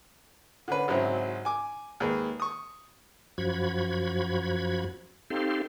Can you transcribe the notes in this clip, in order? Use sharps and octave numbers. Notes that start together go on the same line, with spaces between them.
D3 C#4 B4
G#1 C#3 F#3 G#3 C4 E4
G#5 D6
D#2 G#3 B4
C#6 D#6
F#2 F3 F#4 B5 G#6
C4 D#4 G4 A4 F5 C6